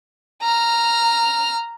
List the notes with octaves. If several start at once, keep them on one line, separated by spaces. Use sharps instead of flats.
A#5 F6